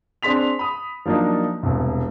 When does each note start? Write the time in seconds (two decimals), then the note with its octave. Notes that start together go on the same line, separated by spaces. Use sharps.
0.23 C4 D4 G#4 C6 B6 F7
0.59 B5 D#6
1.06 F3 F#3 A#3 D4 D#4
1.63 E1 C2